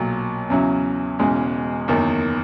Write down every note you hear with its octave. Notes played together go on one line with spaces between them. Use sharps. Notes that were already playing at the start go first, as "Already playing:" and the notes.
Already playing: B1 A#2 F#3
E2 C#3 F#3 C#4 E4
E1 E2 C#3 G#3 C#4
F#1 E2 D#3